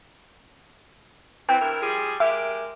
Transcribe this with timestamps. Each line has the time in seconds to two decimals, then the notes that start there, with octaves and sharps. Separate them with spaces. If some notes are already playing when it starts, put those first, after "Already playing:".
1.49 E3 C4 G5
1.61 G2 E4 A#4
1.82 F3 G3 G#4
2.20 G#3 G4 A#4 E5